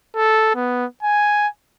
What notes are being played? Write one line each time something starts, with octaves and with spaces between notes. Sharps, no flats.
A4
B3
G#5